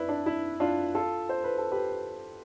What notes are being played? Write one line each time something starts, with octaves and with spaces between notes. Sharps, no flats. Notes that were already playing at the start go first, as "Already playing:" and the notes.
Already playing: E4 B4 D5
D4
E4
D4 F4
F4 A4
C5
B4
A4
G4 B4